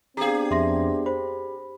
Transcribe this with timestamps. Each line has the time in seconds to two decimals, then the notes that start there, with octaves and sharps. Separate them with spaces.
0.17 B3 C4 D4 G4 G#4 F5 A#5
0.51 F2 E5 C6 A#6
1.06 C5 B5